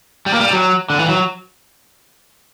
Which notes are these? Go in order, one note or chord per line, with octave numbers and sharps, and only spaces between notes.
G3
A#3
G3
F#3
D3
E3
F#3